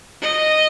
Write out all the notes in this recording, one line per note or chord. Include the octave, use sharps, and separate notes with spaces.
D#5